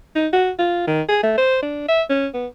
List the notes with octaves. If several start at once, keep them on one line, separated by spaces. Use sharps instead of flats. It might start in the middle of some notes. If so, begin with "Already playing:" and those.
D#4
F#4
F4
D#3
G#4
A3
C5
D4
E5
C#4
B3